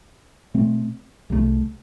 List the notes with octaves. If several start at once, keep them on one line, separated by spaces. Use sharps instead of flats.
B2 A3 C4
C2 C3 E3 A3